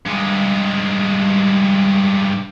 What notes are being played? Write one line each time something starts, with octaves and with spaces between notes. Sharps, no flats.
G2 G#3